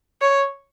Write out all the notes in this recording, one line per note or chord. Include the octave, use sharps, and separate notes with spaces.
C#5